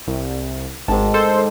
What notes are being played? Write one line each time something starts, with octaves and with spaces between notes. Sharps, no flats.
C2
G#1 G#2 D#3 A5
A4 C5